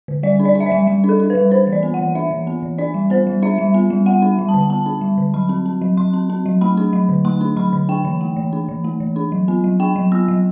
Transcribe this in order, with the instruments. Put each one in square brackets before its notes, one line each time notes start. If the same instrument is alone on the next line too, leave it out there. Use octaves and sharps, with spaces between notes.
[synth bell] D3
G3 D5
D4
D5
D4
E5
D5
G3
G3
D4
A4
D4
B4
G3
D4 C5
E3
D5
B3
F#5
E3
D4 E5
E3
B3
E3
D4 D5
G3
B3 C5
G3
D4 E5
G3
B3
G3
B3 F#5
D4
G3
A5
D3
B3 A5
D4
G3
D3
F#3 B5
C4
C4
F#3
F#3 C6
C4
C4
F#3
A3 B5
D4
F#3
D3
A3 C6
D4
F#3 B5
D3
D4 G5
E3
A3
E3
D4
E3
A3
E3
D4
F#3
B3
F#3
D4 G5
F#3
B3 E6
F#3